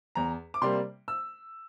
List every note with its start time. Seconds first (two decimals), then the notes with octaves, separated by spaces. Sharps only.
0.15 E2 A#5
0.54 D6
0.62 C3 G3 A#3 C6
1.08 E6